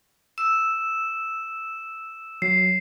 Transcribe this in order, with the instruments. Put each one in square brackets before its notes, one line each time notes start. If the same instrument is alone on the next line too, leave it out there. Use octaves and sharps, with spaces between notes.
[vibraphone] E6 [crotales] E7
[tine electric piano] F#3 [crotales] C7